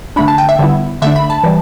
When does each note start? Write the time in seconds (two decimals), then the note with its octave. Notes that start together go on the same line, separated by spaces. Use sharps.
0.16 D3 A3 D4 B5
0.28 A5
0.38 G5
0.49 E5
0.59 D3 G3 B3 E4
1.02 D3 A3 D4 E5
1.16 B5
1.30 A5
1.43 E3 G3